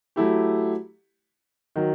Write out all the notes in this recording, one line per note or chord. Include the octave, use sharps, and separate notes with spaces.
F#3 A3 E4 G4
D#3 F#3